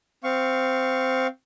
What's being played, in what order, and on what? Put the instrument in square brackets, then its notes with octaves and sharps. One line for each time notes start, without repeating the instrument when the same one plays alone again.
[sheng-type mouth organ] C4 F5 C#6